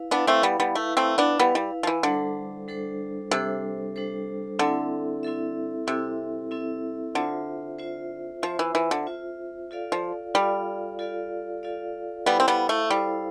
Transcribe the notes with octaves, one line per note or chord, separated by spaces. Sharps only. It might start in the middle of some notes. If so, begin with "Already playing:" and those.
Already playing: E4 B4 F5
B3 D4 E4 B4 F5
A3 C4
G3 B3
G3 B3
A3 E4 B4 F5
A3 C4
B3 D4
G3 B3 E4 B4 F5
G3
F3
E3
D3 G3 D4 A4 C5
G3 D4 A4 C5
C3 G3 D4 A4 C5
G3 D4 A4 C5
D3 C4 E4 A4 E5
C4 E4 A4 E5
C3 C4 E4 A4 E5
C4 E4 A4 E5
D3 F4 C5 E5
F4 C5 E5
F3 F4 C5 E5
E3
E3
D3
F4 C5 E5
F4 A4 D5 F5
F3
G3 F4 A4 D5 F5
F4 A4 D5 F5
F4 A4 D5 F5
G3 B3 E4 A4 C5 F5
C4
G3 B3
A3
G3 E4 A4 C5 F5